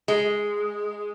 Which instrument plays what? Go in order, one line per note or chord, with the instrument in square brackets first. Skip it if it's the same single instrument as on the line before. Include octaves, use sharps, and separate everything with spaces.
[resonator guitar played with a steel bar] G#3